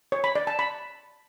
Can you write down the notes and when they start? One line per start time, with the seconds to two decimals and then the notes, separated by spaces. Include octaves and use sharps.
0.12 C#5
0.24 B5
0.36 D5
0.47 A5
0.59 B5